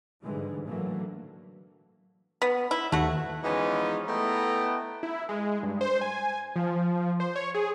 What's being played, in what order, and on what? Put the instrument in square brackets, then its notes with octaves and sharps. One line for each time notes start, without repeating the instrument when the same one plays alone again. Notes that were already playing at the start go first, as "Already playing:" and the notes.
[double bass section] G#2 D3 E3 G3 G#3
A2 D3 E3 F#3 A3 A#3
[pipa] B3
E4
[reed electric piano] D#2 [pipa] A3 F#4
[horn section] E3 F3 G#3 B3 C#4 D#4
A3 B3 E4 D#5 G5 A#5
[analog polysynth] E4
G#3
G2
C5
G#5
F3
C5
C#5
G#4